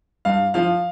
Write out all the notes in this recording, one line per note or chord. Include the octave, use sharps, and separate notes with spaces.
G2 F5
F3 F5